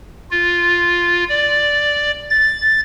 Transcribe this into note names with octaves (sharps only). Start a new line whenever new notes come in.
F4
D5
A6